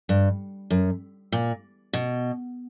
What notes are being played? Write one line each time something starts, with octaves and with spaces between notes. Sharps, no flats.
G2
F#2
A#2
B2